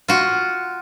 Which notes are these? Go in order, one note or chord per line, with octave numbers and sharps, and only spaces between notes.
F4 F#4